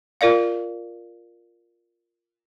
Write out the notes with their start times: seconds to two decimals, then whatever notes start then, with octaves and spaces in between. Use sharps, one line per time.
0.21 F4 A#4 D5 F5